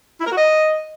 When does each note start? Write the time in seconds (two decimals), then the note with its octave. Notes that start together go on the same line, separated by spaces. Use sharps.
0.21 E4
0.26 A#4
0.32 F#4
0.37 D#5